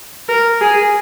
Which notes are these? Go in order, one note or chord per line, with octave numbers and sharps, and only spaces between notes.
A#4
G#4